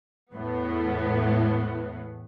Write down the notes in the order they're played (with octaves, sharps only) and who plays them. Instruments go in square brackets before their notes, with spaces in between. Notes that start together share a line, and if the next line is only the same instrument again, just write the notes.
[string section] E2 A2 B3